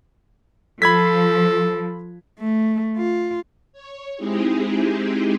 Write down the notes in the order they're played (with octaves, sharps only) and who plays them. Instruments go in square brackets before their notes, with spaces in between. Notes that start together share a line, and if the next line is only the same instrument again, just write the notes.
[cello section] F3 [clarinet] A4 [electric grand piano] B5 G#6 B6
[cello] A3
F4
[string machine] C#5
G#3 C4 D#4 E4 G4 G#4